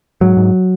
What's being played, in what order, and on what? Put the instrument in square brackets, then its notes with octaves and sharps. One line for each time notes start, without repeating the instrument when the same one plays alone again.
[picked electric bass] G#2 F#3
G#2